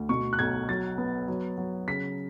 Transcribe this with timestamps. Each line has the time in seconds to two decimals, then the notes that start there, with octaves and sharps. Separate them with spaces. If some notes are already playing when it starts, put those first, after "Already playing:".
Already playing: D2
0.09 B2 C#6
0.33 F#6
0.39 B1 G#6
0.69 F#3 A6
0.98 B3
1.28 F#3
1.58 F#3
1.87 C#3 B6